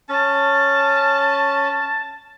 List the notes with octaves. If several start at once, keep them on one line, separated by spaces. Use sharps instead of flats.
C#4 A5